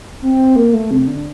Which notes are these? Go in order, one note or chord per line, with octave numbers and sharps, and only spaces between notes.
C4
A#3
A3
C3
D3